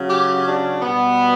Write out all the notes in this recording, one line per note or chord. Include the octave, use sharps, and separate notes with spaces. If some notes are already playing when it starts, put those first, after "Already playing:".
Already playing: C#3 F#3
G4
D4
B2 G3 B3